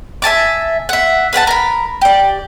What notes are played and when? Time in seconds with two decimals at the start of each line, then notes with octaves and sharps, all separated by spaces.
0.22 E5 G#5 A5 D6
0.89 E5 F#5
1.33 B4 F#5 G5 A5
1.47 A#4 B5
2.01 G4 D5